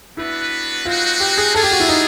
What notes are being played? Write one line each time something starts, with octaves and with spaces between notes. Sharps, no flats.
B3 D4 E4 F#4 B4
G#3 C4 D#4 F4 F#4 B4
G4
G#4
A#3 D4 F4 G#4 A4
G4
F#4
E4
D#4